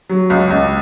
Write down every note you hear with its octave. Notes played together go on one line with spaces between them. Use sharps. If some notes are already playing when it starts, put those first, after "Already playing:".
F#3
C#2
C#2